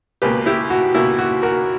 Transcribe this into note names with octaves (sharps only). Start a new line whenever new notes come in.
C#2 B2 A#3 G4 B4
E4 G4
F#4
C#2 B2 A#3 E4
F#4
F#4 A#4